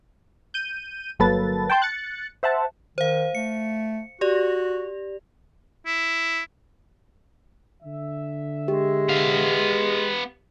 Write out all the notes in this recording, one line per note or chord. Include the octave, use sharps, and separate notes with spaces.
G6 D#7
G1 F#3 A#3 A4 B4 A6
G5 A5 C6 G6
F#6 A6 C#7
C5 E5 F#5 A5
D#3 C5 F5
A3 C#7
F#4 G4 D5
E4
D3 E5
G#3 G4
B3 F5